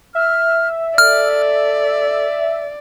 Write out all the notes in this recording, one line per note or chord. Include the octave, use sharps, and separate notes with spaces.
E5 F6
A4 D5 F6